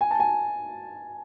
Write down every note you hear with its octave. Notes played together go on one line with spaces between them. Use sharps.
G#5
A5
G#5